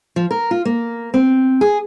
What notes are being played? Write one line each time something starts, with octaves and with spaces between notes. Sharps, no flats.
F3
A#4
F4
A#3
C4
G#4